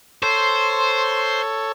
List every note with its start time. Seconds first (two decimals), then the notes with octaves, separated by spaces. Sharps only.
0.23 A4 C5 C#5 C6